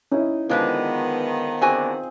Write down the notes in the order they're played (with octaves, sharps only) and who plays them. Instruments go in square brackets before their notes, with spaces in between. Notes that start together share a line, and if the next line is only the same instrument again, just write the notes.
[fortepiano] C#4 E4 [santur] D#4
[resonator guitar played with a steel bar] D3 G#3 B4 [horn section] D#3 B3 [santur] F3 D#5 D#6
[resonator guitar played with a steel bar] D3 F#4 G#5 [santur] C4 G#4